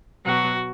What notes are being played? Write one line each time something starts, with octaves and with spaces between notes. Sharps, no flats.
B2 F#3 F#4